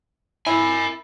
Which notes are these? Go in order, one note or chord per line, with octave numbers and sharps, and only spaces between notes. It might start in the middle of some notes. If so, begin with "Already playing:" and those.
E4 A#4 G#5